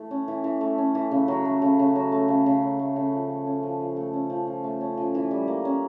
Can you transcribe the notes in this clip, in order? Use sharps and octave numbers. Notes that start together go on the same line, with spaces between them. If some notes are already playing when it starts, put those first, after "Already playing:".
Already playing: E3 A3
C#4
E3
E3
A3
C#4
E3
C#3
F#3
A3
C#3
C#3
F#3
A3
C#3
C#3
F#3
A3
C#3
F3
A3
C#4
F3
F3
A3
C#4
F3
F3
A3
C#4
F3
E3
G3
A#3
C#4